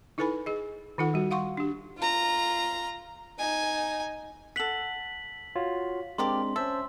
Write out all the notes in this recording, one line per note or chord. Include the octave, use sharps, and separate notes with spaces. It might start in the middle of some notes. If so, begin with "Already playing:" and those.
D#4 E4 A4 B4 G#5 B5
G#4 D#5
D#3 D#4 F4 A4 F#5
G3 F#4
F5 F#5 C6 C#6
D4 G4
F4 A#5
D#4 G#5
A4 F#5 B6 F#7
F4 F#4 C#5
G#3 C4 D4 G4 A#4 D5 C6
C#4 C5 E5 A5